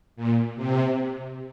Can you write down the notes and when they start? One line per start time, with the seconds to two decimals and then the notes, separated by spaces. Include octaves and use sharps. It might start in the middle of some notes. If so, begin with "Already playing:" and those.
0.16 A#2
0.56 C3